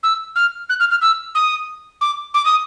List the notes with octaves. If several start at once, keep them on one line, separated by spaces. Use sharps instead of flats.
E6
F6
F#6
F6
F6
E6
D#6
D6
D6
D#6